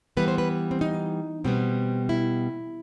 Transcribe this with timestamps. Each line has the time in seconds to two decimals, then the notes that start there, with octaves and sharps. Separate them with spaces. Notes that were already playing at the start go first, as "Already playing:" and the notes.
0.17 E3 G3 B3 B4
0.28 C5
0.38 B4
0.71 C4
0.81 D#4
1.44 B2 G3 B3 C4
2.09 E4